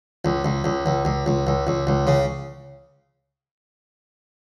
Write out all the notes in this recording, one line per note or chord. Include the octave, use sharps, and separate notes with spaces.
C#2
C#2
C#2
C#2
C#2
C#2
C#2
C#2
C#2
C#3